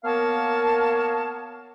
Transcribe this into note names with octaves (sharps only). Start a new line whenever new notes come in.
A#3 B3 A#4 C#5 F5 A5